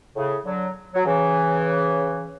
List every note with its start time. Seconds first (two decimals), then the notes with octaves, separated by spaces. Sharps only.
0.15 A2 C#3
0.45 D3 F#3
0.94 F#3
1.05 C#3 E3